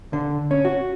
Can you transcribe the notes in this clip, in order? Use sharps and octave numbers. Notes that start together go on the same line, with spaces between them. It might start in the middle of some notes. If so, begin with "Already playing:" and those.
D3
C#4
F#4